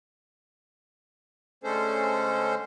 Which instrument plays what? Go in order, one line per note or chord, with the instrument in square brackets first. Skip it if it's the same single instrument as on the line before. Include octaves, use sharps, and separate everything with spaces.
[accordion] D3 G#3 A3 C#4 A4 C5